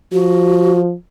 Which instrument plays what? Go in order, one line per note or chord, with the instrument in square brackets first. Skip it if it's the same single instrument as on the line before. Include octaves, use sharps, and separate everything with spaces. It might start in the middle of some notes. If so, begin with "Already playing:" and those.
[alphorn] F3 [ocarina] F#4